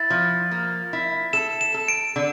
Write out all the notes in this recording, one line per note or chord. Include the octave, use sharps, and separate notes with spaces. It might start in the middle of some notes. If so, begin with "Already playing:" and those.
Already playing: E4 A6
F3
A#3
E4
A4 E7
E7
A4
D7
D3